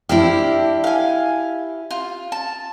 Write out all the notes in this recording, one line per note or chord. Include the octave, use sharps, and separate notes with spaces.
C4 D4 E4 G4 F6
F5 G#5
F4
A5